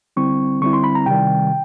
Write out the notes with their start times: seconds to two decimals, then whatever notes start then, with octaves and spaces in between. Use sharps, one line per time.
0.17 D3 G3 C4 E4 C#6
0.61 D3 G3 C4 E4 C#6
0.73 C6
0.84 B5
0.95 A#5
1.06 C3 D#3 G3 G5